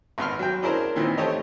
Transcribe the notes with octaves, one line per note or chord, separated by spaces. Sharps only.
G#1 B3 C6 F6
F#3 G5
C#4 D4 E4 G#4 A#4 C5
A#2 D#3 E3 C4
A3 G4 C5 C#5 D#5